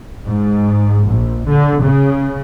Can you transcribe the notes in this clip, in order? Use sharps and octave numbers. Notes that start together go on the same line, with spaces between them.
G#2
A#1
D3
C#3